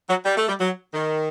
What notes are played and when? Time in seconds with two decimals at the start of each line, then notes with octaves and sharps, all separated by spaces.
0.09 F#3
0.25 G3
0.37 A3
0.48 G3
0.59 F#3
0.93 D#3